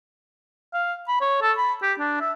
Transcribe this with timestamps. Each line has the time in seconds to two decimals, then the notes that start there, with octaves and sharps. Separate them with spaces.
0.74 F5
1.08 B5
1.21 C#5
1.42 A4
1.58 B5
1.82 G4
1.99 D4
2.21 E5